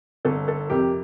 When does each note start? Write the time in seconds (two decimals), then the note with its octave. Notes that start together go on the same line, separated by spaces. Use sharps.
0.25 G1 A4
0.48 A4
0.70 F2 C3 G4 A#4